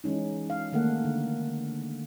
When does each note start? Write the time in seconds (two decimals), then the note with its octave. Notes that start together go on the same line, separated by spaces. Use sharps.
0.04 E3 G#3 C#4 D#4
0.50 F5
0.72 D#3 A3 A#3 A4 F#5
1.04 D3